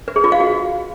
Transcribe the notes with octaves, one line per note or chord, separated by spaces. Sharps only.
B4
G#4
F4
F5
F#4